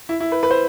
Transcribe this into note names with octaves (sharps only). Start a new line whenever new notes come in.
E4
E4
B4
B4
C5